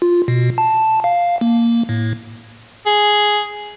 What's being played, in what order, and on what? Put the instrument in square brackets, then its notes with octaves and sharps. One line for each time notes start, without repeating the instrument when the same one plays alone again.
[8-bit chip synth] F4
B2
A5
F5
A#3
A2
[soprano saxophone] G#4